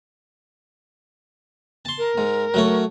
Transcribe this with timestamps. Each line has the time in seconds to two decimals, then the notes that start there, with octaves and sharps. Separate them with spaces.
1.85 A5 C6
1.98 A#4
2.18 G#2
2.54 F#3 A3 C#5